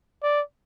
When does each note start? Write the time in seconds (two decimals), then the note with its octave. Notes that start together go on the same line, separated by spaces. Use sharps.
0.23 D5